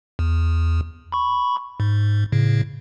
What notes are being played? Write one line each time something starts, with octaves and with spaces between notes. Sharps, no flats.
E2
B5 C#6
G#2
A2 C#3